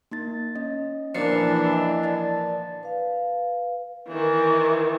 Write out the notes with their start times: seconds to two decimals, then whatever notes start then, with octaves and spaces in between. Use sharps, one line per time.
0.11 A#3 D#4 A6
0.56 C#4 D#5
1.15 A#2 E3 F3 D4 A6 C7 C#7
1.73 D#5
2.03 D5 A5 A6
2.83 B4 F5
4.08 D#3 E3